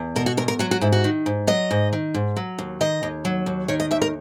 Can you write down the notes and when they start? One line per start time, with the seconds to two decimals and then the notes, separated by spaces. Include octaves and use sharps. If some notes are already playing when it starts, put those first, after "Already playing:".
Already playing: E2
0.16 B2 A#4
0.26 F#4
0.37 E2 A#4
0.48 A#4
0.59 F#3 F#4
0.71 F#4
0.81 G#2 E4
0.92 F#4
1.04 D#3
1.26 G#2
1.47 F#3 D#5
1.71 G#2
1.93 D#3
2.14 G#2
2.36 F#3
2.58 D#2
2.81 D#3 D#5
3.03 D#2
3.25 F#3
3.46 D#2
3.68 D#3 C#5
3.80 D#5
3.91 D#2 E5
4.02 A#4